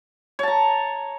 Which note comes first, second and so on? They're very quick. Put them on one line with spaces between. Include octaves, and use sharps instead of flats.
C#5 A5 A#5